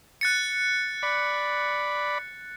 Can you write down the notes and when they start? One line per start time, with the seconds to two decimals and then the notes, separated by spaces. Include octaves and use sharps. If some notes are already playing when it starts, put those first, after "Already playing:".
0.21 F#6 A6 C#7
1.03 D5 B5